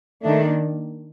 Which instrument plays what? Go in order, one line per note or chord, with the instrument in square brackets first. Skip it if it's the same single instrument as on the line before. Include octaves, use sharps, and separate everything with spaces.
[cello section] D#3 A#3 D4 [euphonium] A3